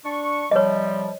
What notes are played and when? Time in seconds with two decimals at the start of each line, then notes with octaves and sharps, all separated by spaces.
0.04 D4 C#6
0.51 C3 F3 G3 C#5 D#5